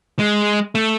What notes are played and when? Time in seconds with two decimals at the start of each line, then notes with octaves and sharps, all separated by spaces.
0.19 G#3
0.75 A3